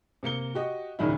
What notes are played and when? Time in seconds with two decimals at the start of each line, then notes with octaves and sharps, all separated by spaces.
0.23 C3 A#3 C#7 G7
0.54 F#4 G4 D#5
0.99 F#1 D#2 A#2 D#3 D4 E4